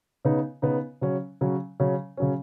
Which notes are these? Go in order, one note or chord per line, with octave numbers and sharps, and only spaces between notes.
C#3 B3 D#4
C#3 B3 D#4
C#3 F#3 C#4
C#3 F#3 C#4
C#3 F#3 C#4
C#3 F#3 C#4